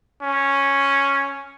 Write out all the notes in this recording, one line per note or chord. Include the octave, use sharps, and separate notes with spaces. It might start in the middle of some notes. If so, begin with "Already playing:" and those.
C#4